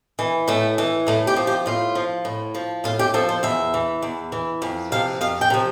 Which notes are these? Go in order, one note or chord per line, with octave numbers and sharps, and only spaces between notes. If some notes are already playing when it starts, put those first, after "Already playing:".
E3
A2 A3
E3
A2 A3
G4
F3
G4
A2 F4
F3
A2
F3
A2 F4
G4
F3 A4
C5
E2 E5
E3
E2
E3
F2
C3 F3 F5
F2 F5
G5
C3 F3